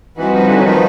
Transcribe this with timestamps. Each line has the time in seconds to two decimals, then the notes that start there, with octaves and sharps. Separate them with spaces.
0.17 E3 G3 C4 D#4 F#4 B4
0.32 F3
0.45 D3 E3
0.57 F#3
0.64 D#3 F3